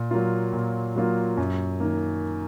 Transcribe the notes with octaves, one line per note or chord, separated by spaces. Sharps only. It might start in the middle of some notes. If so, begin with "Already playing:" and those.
Already playing: A#2
F#3 A#3 F4
A#2
F#3 A#3 F4
F#2
D#3 A#3